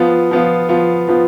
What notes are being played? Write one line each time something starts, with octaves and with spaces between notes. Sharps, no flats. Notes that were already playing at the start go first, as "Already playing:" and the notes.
Already playing: F3 B3 F4
F3 B3 F4
F3 B3 F4
F3 B3 F4